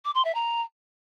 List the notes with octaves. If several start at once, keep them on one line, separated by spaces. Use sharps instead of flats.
D6
C6
E5
A#5